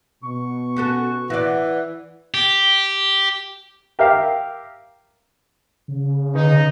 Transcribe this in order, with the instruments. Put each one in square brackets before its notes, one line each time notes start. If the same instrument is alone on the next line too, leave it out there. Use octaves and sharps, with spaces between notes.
[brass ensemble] B2 [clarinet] C#6
[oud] C#4 F#4 A4
[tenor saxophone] E3 [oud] F#4 D5
[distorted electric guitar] G4
[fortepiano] G4 A#4 E5 F5
[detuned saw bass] C#3
[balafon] D3 [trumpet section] D#4